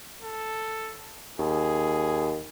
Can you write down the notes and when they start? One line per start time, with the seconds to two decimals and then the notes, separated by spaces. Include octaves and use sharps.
0.22 A4
1.39 D#2 G#4